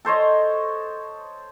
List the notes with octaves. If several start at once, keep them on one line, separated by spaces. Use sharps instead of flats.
A4 C5 C#5 D#5